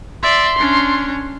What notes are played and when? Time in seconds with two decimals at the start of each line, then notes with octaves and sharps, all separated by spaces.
0.23 D5 E5 C6
0.59 C#4 D4